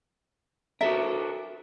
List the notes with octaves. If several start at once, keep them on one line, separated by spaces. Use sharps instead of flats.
F#4 A4 A#4 E5